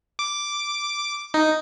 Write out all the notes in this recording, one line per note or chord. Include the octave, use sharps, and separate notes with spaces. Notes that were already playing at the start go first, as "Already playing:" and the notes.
D6
D#4